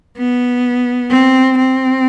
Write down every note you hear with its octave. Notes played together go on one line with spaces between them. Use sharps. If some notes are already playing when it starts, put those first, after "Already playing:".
B3
C4
C4